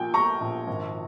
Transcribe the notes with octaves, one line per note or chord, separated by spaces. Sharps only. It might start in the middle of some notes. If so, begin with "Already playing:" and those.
Already playing: A#1 A#2 G5 G#5
F3 A#5 C#6
A#1
G#1